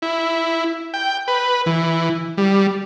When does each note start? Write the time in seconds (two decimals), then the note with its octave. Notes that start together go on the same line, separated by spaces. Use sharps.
0.02 E4
0.94 G5
1.28 B4
1.66 E3
2.38 G3